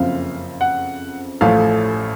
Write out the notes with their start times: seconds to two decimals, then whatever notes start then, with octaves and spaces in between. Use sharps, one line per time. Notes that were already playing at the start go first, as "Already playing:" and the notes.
Already playing: F#1 F2 C#3 F3 C4 F5
0.61 F#5
1.41 A1 A2 F3 A3 F5